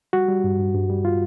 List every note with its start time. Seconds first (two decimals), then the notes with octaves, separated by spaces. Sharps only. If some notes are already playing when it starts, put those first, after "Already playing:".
0.13 G3 F#4
0.28 G3
0.44 G2
0.59 G2
0.75 G2
0.90 G3
1.05 F4